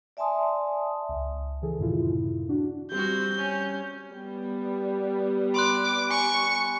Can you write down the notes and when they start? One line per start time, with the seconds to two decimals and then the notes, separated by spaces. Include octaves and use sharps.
0.17 D5 E5 G#5 A5 C6 D#6
1.09 C#2
1.62 C#3 E3 G#4 A4
1.79 F#2 A2 C3 D#3 E4 F4
2.49 D4 F#4
2.92 G3 C4 F#4 G6
3.36 C#4
4.13 G3 B3
5.54 B5 C6 D6 F#6
6.10 G#5 C#6